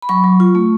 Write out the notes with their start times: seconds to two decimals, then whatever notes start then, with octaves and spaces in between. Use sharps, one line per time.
0.02 B5
0.09 F#3 C#6
0.24 F#3
0.40 F4
0.55 A3